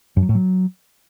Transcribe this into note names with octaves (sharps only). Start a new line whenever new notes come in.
F#2
F#3
A2
F#3